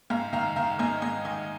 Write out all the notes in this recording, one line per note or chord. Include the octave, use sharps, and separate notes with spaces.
G#2 F5 A#5
D#3 F5 A#5
D#3 F5 A#5
G#2 D#5 G#5
G#2 D#5 G#5
D#3 D#5 G#5